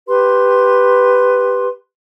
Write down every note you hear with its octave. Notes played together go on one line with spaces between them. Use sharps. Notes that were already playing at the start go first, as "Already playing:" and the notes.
G4 B4 C6